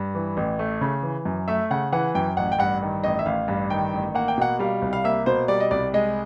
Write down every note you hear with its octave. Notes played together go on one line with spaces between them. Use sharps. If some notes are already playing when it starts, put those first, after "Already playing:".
Already playing: G2
E3
A1
A3
C#3
E3
F#2
A3 E5
C#3 F#5
E3 F#5
F#2 G5
A1 F#5
G5
G2 F#5
D#3
A1 D#5
E5
A1 F5
G2
D#3 G5
A1
A#3 F#5
G5
B2 F#5
G3 F5
C2
F5
A#3 E5
B2 C5
G3 D5
D#5
C2 D5
G#3 D#5